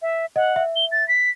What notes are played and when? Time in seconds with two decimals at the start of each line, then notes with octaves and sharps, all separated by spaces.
0.02 E5
0.36 D#5 F#5
0.56 E5
0.76 G7
0.92 A6
1.08 B6